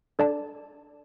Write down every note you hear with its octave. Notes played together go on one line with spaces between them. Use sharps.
D4 A4 D5 A5